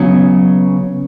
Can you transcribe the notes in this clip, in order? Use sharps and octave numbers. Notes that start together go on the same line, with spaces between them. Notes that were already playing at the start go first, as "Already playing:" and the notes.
Already playing: C#3 F#3 B3 C#4